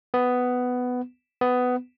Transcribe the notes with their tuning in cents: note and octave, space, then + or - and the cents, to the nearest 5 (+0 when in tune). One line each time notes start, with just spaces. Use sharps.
B3 +10
B3 +15